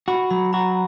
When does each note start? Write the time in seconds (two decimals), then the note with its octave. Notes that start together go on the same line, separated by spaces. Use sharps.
0.08 F#4 B5
0.30 F#3 B5
0.53 F#4 A#5